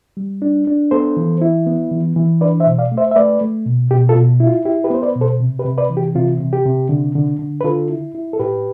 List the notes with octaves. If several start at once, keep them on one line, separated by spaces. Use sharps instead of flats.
G3
D4
D4
B3 A4 C5
E3
E4
B3
E3
E3
D4 B4 D5
C5 E5
B2
D5 F5
A3
C5 E5
E5
A3 B4 D5
A3
B2
B2 G4
F4 A4
B2
E4
F4
E4 G4
G4 B4
B3 C5
B4 D5
B2
A4 C5
C3
G4 B4
C3
B4 D5
E3
G4
C3 F4
C3
G4
C3
D3
D3
D3
B4
D3 F4 A4
E4
E4
A4
A2 G4 B4